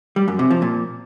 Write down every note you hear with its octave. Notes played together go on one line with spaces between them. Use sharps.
G3
F#2
C3
F3
A#2